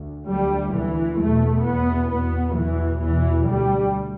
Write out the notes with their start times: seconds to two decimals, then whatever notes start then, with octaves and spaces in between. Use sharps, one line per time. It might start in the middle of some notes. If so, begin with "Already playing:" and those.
Already playing: D2
0.30 D2 G3
0.75 D2 E3
1.20 E2 B2 A3
1.66 E2 B2 B3
2.11 E2 B2 B3
2.57 E2 B2 E3
3.02 E2 B2 E3
3.48 D2 G3